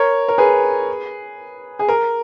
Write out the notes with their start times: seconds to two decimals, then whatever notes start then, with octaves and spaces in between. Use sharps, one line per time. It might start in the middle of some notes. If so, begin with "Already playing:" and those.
Already playing: A#4 C#5
0.28 A#4
0.38 G#4 B4
1.79 G#4
1.88 A#4